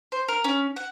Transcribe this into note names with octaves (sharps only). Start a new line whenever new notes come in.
C5
A#4
C#4
F#5